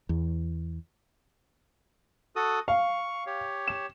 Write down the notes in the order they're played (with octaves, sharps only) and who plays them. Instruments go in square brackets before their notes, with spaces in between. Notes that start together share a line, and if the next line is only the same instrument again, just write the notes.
[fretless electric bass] E2
[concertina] F#4 A4 D#6
[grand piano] F5 [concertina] C#6
[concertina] G4 C#5
[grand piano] E7